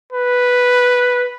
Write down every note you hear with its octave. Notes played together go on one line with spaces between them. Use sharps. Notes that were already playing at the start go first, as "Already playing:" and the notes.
B4